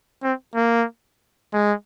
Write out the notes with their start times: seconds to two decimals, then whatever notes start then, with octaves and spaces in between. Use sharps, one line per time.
0.23 C4
0.55 A#3
1.53 G#3